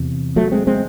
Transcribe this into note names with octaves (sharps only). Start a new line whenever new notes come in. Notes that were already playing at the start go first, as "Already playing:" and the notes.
Already playing: E2 C3
F#3 A3
G#3 C4
G#3 C4